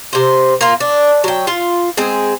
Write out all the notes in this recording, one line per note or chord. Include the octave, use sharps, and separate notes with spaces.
C3 C5
A#3 F4
D4
F#3 G5
F4
G#3 C4 G#4